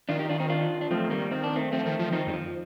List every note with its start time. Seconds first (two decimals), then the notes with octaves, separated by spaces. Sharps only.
0.09 D#3 D4 F4
0.19 D#4 G4
0.29 D4 F4
0.39 C4 D#4
0.50 D4 F4
0.81 D4
0.91 F3 A3 C4
1.04 D#3
1.10 G3 A#3
1.18 D#3
1.31 D#3 C4
1.44 D4
1.56 A3 C4
1.72 F3 A3 C4
1.86 D#3
1.99 F3
2.12 D#3 C4 D#4
2.27 F2 G3
2.33 F3